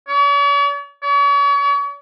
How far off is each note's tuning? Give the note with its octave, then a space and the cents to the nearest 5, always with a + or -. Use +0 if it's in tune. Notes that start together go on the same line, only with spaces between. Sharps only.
C#5 +45
C#5 +40